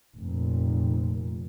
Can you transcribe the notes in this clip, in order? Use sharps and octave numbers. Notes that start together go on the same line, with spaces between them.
F1 A#2